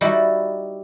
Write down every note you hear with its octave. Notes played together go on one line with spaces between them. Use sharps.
G3 D#4 E4 F#4